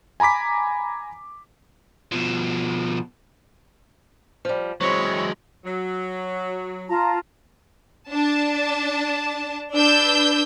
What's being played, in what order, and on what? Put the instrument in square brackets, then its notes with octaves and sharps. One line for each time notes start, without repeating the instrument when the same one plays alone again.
[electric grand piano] G#5 A#5 B5 D6 B6
[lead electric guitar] B2 F3
[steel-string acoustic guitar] F3 G3
[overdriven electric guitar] F#3 G#3 [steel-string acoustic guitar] C4 E4 [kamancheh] C#5
[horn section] F#3
[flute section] F4 A5 A#5
[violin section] D4 A5
D4 B4 E6 G6